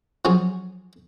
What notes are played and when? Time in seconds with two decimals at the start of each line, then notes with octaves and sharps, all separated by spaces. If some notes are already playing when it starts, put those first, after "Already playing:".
0.25 F3 F#3 C#4 G#4